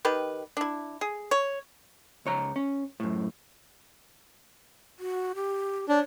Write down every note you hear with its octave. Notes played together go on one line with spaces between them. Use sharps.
D#3 G4 B4
D4 E4
G#4
C#5
C#2 C#5 A#5
C#4
F#2 A2
F#4
G4
D4 C#5